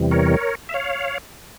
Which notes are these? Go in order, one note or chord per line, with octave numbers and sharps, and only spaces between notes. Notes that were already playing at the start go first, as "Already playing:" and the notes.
Already playing: E2 C3 E3 G3
A#4 C#5
E5
C#5 F5